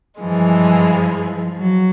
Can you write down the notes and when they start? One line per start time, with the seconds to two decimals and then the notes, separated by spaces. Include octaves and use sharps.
0.21 G2 E3 F3 G#3
1.58 F#3